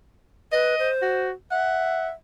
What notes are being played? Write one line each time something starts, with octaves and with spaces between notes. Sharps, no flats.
B4 D#5
C5
F#4
E5 F#5